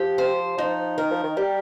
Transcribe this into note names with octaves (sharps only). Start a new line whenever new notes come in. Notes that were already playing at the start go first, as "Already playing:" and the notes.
Already playing: F3 G4
C5
F3 D#4
D#3 A#4
F3
D#3
G3 G4